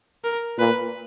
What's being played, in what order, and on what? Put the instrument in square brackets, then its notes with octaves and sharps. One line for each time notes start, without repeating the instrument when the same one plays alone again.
[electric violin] A#4
[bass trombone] A#2 [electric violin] B4